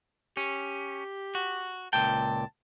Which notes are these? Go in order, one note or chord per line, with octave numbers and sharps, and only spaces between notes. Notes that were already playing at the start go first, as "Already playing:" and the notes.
C#4 G4
F#4
C#2 A#2 G5 A5